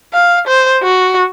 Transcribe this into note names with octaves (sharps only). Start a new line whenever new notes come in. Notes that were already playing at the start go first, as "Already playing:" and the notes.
F5
C5
F#4